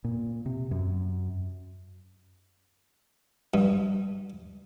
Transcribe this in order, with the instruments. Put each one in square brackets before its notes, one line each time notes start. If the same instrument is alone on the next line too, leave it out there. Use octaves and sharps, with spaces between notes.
[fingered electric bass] A#2
C3
F#2
[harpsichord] G2